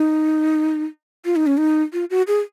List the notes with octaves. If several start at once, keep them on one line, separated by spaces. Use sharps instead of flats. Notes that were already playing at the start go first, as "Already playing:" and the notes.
Already playing: D#4
F4
D#4
C#4
D#4
F4
F#4
G#4